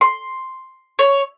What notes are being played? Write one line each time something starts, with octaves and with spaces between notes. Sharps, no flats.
C6
C#5